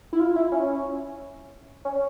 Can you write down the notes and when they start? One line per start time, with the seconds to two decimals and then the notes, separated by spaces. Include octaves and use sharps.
0.13 E4
0.20 F4
0.36 E4
0.52 C#4
1.85 C#4